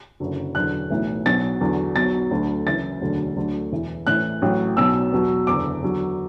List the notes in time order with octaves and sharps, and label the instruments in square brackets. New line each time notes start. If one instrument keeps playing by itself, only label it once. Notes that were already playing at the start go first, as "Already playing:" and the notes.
[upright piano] F#1 F#2 D3 F#3
E1 E2 D3 F#3 F#6
B1 A2 E3
B1 B2 F#3 A6
E2 D3 F#3
B1 B2 F#3 A6
D2 D3 F#3
F#1 F#2 E3 A6
E1 D2 D3 F#3
D2 D3 F#3
E1 E2 E3
A1 A2 E3 F#6
A1 A2 F#3
B1 B2 F#3 E6
E2 B2 F#3
F#1 E2 D3 D6
E2 D3 F#3